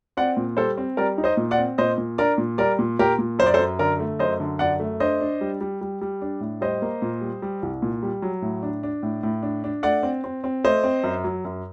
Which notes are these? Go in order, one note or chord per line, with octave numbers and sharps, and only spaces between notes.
C4 D5 F#5
A#2
G3 A4 C5
C4
G3 A#4 D5
D#4
C5 D#5
A#2
D5 F#5
C4
A#2 C5 D#5
A#2
D4 A#4 D5
A#2
G3 A#4 D5
A#2
A#2 G4 A#4
A#2
F#2 C5
D5
A4 C5
F#2
D3 A#4 D5
A3
F#2 C5 D#5
D3
F#2 D5 F#5
A3
D4 C5 D#5
D4
G3
G3
G3
G3
D4
A2
G3 C5 D#5
A#3
A#2
G3
G3
C2
A#2
G3
F#3
A2
D4
D4
A2
A2
D4
D4
A3 D5 F#5
C4
C4
C4
A3 C5 D#5
C4
F#2
F#3
F#2